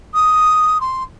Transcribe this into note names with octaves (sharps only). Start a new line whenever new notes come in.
D#6
C6